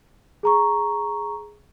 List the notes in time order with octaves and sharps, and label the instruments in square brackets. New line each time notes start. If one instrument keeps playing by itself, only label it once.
[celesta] G#4 A#5 C#6